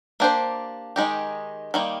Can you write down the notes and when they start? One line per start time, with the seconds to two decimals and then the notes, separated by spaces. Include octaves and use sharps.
0.20 A#3 D4 G4 C5
0.96 D#3 G#3 D#4 G4
1.74 D#3 G3 A#3